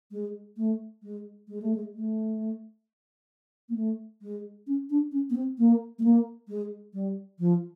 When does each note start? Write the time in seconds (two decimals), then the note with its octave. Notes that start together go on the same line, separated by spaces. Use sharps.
0.11 G#3
0.57 A3
1.03 G#3
1.48 G#3
1.62 A3
1.75 G#3
1.95 A3
3.69 A#3
3.76 A3
4.22 G#3
4.67 C#4
4.90 D4
5.12 C#4
5.30 B3
5.35 C4
5.58 A#3
5.99 A3
6.03 A#3
6.48 G#3
6.94 G3
7.39 F3